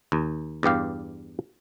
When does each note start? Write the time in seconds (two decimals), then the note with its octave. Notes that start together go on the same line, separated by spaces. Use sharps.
0.12 D#2
0.63 E2 G2 G4 F5